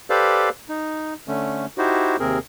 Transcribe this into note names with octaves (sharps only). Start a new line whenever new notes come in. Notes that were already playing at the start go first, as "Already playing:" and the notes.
G4 A4 B4 C5 D5 F5
D#4
D3 A3 C#4
D#4 E4 F#4 G4 C5
D#2 C3 C4 G#4 A#4